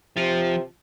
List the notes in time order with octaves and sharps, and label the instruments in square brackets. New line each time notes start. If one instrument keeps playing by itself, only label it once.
[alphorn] C3 [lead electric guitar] F3